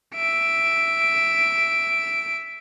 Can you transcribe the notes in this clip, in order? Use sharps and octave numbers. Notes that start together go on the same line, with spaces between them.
E5 D7